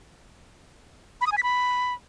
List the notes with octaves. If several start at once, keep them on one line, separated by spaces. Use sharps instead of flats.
B5
D#6
G#5
B6
B5